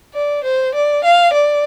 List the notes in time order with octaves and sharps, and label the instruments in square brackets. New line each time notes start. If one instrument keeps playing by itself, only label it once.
[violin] D5
C5
D5
F5
D5